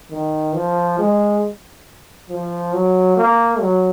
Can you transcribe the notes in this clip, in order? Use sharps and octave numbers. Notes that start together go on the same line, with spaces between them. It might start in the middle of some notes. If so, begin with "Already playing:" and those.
D#3
F3
G#3
F3
F#3
A#3
F#3